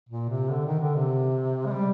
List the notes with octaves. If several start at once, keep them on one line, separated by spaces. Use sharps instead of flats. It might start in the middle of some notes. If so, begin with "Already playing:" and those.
A#2
C3
D3
D#3
D3
C3
G#3
G3